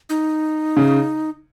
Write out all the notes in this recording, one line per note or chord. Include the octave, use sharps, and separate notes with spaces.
D#4
C#3